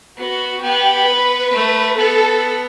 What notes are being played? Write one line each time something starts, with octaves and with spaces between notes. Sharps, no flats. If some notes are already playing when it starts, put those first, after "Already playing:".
B3 F#4
B3 G4
B4
A3
B3 A4